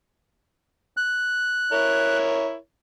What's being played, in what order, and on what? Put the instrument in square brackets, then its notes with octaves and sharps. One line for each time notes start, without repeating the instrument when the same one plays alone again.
[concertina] F#6
[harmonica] E4 A#4 C#5